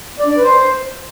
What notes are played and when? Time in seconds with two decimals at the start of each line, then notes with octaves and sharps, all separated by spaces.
0.20 D5
0.25 D4
0.31 D5
0.37 B4
0.43 C5